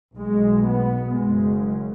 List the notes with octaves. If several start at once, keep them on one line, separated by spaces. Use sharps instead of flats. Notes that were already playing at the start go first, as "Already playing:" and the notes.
B1 B2 G#3
B3
F#1 F#2 C#3 G#3